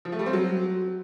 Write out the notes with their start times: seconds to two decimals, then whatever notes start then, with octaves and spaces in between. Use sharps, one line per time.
0.05 F3
0.12 A3
0.19 G3
0.26 C4
0.33 F#3